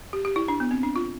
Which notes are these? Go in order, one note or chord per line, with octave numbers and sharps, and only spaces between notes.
G4
G4
E4
D4
B3
C4
D4
F4